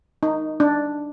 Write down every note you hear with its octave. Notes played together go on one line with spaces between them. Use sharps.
D#4
D4